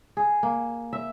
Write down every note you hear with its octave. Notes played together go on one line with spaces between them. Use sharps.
G#4
A#3
E5